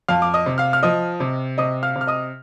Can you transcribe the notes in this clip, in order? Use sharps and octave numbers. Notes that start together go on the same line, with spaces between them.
F2 F5 F6
D6
D#5 D#6
C3
F5 F6
F6
F3 D#5 D#6
C3
C3 D#5 D#6
F5 F6
C3
F6
D#5 D#6